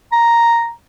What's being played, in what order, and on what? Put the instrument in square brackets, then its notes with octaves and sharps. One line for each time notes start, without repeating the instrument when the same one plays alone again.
[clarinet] A#5